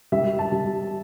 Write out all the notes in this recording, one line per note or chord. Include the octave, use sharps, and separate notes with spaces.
G3 E5
A5
G3